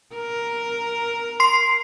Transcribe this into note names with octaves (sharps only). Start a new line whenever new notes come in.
A#4
C6 C7